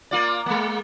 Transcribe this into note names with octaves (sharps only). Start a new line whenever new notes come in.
A#3 F4 D5
G#3 A#3